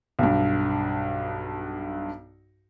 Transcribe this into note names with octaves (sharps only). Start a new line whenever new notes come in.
B1 G2